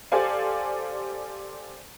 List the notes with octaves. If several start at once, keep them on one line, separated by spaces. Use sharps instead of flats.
G4 A4 C5 D5 F5 G#5